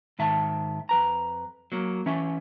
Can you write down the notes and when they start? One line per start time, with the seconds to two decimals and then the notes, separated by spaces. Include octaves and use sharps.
0.19 G#2 D#3 E5 A5
0.89 F2 B4 A#5
1.72 F#3 A#3
2.06 E3 C#4 E5